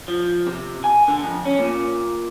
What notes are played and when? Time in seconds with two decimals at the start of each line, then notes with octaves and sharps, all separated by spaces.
0.08 F3
0.47 C3
0.84 G#5
1.08 D3
1.23 F2
1.45 C#4
1.59 A#2